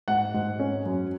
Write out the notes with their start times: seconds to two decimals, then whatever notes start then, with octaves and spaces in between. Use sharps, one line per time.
0.08 G#2 F#5
0.34 G#2
0.59 C#4
0.85 F#2